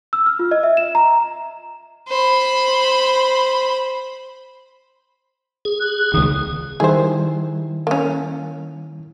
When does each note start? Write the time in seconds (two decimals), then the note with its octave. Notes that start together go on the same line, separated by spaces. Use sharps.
0.13 E6
0.26 F6
0.39 F4
0.51 D#5
0.63 E5
0.77 E7
0.95 A#5
2.08 C5 B5
5.65 G#4
5.80 F#6
6.14 C#2 D#3 D#6
6.80 D#3 G3 E4 G#4 C5
7.87 A#3 C#4